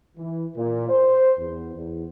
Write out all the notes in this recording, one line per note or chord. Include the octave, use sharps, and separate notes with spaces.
E3
A#2
C5
E2
E2